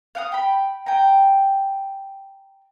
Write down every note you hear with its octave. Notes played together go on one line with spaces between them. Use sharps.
F5 F#5 D#6
G5 B5
G5 G#5 A#5